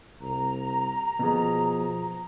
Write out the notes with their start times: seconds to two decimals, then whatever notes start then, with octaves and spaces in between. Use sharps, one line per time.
0.21 C2 A#5
1.19 B2 F3 G#4